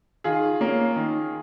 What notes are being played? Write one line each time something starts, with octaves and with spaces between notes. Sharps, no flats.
D#3 F4 G#4
A#3 C#4
D#3